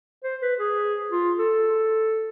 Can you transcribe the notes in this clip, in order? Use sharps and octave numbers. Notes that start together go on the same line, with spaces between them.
C5
B4
G#4
F4
A4